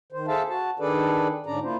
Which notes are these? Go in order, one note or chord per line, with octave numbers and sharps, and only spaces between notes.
D#3 C5
G#4 A4 C5 E5 F5 A5
F#4 A5
D#3 D4 G#4 A4 B4 D5
G#2 D3 C#4 D4 D5 A#5
A#3 E4 F4 C5